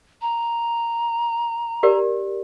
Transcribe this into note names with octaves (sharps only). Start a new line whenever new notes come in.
A#5
G4 A#4 D5